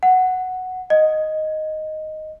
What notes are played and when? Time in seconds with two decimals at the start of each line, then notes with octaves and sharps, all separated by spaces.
0.03 F#5
0.90 D#5